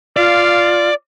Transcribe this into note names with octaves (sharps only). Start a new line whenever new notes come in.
F4 D5 F5